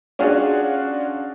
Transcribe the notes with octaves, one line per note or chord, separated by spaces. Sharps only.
C#4 D4 F4 F#4 G#4